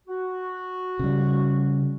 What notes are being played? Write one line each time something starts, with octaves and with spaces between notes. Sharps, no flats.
F#4
C#3 G3